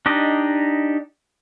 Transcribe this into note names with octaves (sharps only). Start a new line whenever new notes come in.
D4 D#4 G4 D#5